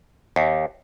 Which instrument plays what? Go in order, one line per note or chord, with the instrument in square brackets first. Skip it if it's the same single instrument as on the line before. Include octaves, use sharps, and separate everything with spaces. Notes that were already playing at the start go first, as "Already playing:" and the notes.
[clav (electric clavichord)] D#2